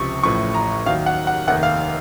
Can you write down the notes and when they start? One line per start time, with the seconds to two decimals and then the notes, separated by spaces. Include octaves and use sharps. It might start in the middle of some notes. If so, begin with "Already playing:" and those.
Already playing: C#2 C3 F3 C#6
0.23 A1 A2 F3 C#6
0.54 A#5
0.86 D#2 D#3 F#3 F5
1.06 F#5
1.27 F#5
1.47 F1 D#2 D#3 F#5
1.63 F5